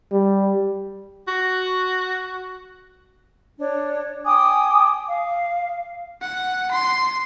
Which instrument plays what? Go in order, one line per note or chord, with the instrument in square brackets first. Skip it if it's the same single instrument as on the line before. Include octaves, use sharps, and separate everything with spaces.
[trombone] G3
[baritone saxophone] F#4
[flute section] D4 C#5
G5 G#5 D6 D#6
F5
[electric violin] F#5
C6